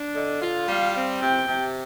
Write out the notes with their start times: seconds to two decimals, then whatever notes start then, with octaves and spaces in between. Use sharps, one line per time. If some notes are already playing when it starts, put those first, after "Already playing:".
Already playing: D4
0.15 D3 D#5
0.42 F4
0.68 G3 F5
0.96 C4
1.22 C3 G5
1.48 C3